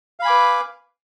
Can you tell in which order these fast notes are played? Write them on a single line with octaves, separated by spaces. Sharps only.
F5 B5 G#5 D6 B4